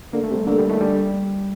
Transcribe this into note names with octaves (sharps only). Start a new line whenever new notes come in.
D3 A#3
A3
C3
G3
D3 A#3
G3
D#3 A3
D3 G3